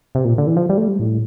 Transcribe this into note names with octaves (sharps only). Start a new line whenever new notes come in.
C3
A#2
D3
E3
F3
G3
A3
G3
A2